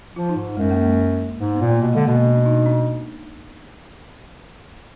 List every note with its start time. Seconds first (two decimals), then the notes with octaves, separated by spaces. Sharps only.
0.16 F3 F4
0.29 D#4
0.36 G#2
0.57 F#2 G#3
0.71 A#3
0.85 G#3
1.40 G#2
1.54 B3
1.61 A#2
1.69 A#3
1.82 B2
1.93 G#3
1.95 D3
2.04 A#3
2.08 B2
2.14 B3
2.25 D4
2.36 D4
2.46 D#4
2.58 D#4
2.66 D4